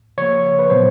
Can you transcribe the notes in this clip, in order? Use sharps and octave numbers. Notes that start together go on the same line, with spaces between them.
C#3 F3 A#3 C#5
B4
A#2 F#3 B3 C5